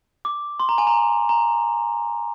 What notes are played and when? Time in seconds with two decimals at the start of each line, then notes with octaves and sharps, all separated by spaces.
0.25 D6
0.60 C6
0.69 A#5
0.78 G#5
0.87 A#5
1.29 A#5